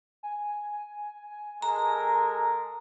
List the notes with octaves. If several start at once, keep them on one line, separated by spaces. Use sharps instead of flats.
G#5
G#3 A4 A#4 A#5